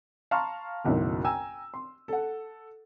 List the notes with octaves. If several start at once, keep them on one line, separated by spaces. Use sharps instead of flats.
F5 A5 A#5 C6 C#6 F6
F#1 B1 F#2 A2 D#3
G5 G#5 A#5 E6
C6
A4 F#5